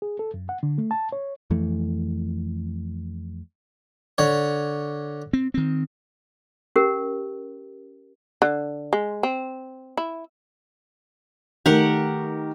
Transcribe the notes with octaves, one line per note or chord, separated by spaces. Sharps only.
G#4
A4
F#2
F#5
D3
A3
A5
C#5
F2 E3 A3
D3 C#5
C4
D#3 C4
C#4 G4 A#4
D3
G#3
C4
E4
D#3 A3 G4 A#4 F#5